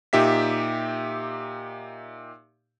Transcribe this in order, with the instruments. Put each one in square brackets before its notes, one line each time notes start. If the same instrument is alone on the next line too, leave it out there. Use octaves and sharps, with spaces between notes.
[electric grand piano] A#2 D#4 G4 E5 B6